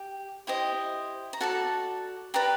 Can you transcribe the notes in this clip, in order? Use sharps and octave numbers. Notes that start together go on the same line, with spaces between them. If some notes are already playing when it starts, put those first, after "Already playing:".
Already playing: G4
E4 G4 C5 D#5
A#5
F#4 A4 D5 A5
G4 B4 D5 A#5